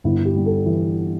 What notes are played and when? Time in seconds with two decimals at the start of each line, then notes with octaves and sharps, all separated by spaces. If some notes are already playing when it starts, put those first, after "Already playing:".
0.04 G1 E4
0.25 G4
0.36 G3
0.46 A4
0.66 E3